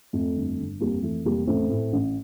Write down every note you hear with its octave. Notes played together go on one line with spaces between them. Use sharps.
F2 A3
G1
G1
F2 G3 A#3
E3 A3
F1 G3 A#3
A1 A3 C4
A2
A1